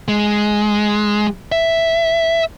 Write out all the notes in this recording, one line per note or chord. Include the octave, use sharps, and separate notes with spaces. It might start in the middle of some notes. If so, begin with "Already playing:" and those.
G#3
E5